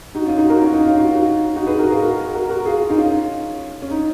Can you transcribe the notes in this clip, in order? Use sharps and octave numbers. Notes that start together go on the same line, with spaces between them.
D#4 F#4
C#4 F4
D#4 F#4
F#4 A#4
C#4 F4
D#4
C#4 F4
F#4
F4
D#4 F#4
D#4 F#4
G#4 B4
F#4 A#4
F4 G#4
F#4 A#4
F#4 A#4
F#4 A#4
F4 G#4
F4
D#4
C#4 F4
C#4
D#4